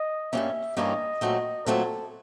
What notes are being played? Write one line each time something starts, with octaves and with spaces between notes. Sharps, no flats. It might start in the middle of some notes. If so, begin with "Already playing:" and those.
Already playing: D#5
G2 E3 G3 A#3 C#4 E5
G2 E3 G3 A#3 C#4 D#5
A#2 F#3 A3 C4
A#2 F#3 A3 C4 A4